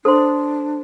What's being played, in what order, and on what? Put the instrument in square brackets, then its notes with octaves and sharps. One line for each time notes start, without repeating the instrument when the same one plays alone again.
[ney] D4 [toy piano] A4 C5 C6